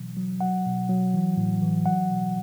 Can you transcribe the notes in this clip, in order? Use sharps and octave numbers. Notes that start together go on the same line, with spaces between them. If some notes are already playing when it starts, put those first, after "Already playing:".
Already playing: B2 E3 F#3
F#3
F#3 F#5
B2
F#3
E3
A2
E3
F#3 F#5
B2